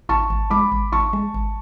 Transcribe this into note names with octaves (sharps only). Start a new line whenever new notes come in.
G#1 A5 C#6
G#1
G#3 B5 D6
G#1
G#1 A5 C#6
G#3
G#1